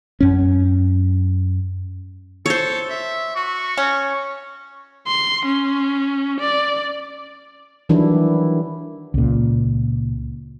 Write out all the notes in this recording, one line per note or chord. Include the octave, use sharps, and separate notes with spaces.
F#2 C#4
A4 C5 C#5
E5
F#4 C#6
C#4
C6
C#4
D5
D#3 E3 F#3 G3 D4 E4
C#2 A#2